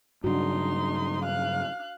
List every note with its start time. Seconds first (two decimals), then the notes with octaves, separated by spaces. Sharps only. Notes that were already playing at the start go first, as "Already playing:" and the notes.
0.24 G2 C#3 F#3 D4 D#4 F#4 C6
1.23 F5 F#6